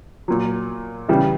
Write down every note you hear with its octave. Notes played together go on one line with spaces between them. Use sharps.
A#2 F#3
C#3 E3 G3